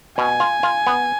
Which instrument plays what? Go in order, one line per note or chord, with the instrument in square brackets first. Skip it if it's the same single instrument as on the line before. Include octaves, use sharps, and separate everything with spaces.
[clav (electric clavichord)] B2 [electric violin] G#5
[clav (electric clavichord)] F4
F4
B3